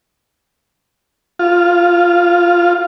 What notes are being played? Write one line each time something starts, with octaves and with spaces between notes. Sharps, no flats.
F4